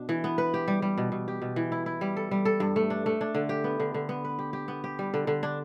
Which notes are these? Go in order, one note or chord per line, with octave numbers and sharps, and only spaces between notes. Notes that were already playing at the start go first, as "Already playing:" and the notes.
Already playing: B2 D4
E3
B3
B4
G4
G3
G3
B2
B2
G4
B2
E3
E4
E4
G3
A4
G3
A4
G2
A3
D4
A3
D4
D3
G4
B3
D3
D3
B3
B4
G4
G4
B3
G4
G3
D3
D3
D4